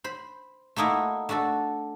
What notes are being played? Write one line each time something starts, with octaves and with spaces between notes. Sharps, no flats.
C5 B5
A3 A#3 D#4 E4 F#4
A3 D4 F#4 A4